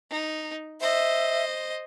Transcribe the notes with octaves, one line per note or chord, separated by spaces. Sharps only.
D#4
C5 D#5 E5